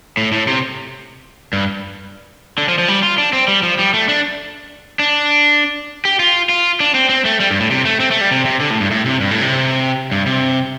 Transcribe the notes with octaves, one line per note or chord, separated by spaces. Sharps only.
A2
A2
C3
G2
D3
F3
F3
G3
F4
D4
C4
G3
F3
G3
A3
D4
D4
G4
F4
F4
D4
C4
C4
A3
G3
G2
A2
C3
A3
C4
A3
G3
C3
C3
D3
A2
G2
A2
C3
G2
A2
C3
G2
C3